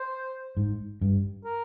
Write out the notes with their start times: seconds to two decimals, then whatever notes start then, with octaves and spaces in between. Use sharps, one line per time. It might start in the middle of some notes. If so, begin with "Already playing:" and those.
Already playing: C5
0.57 G#2
1.01 G2
1.45 A#4